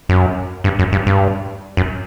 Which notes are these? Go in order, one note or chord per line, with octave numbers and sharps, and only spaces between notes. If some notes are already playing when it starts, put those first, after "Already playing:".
F#2
G2
F#2
G2
G2
F#2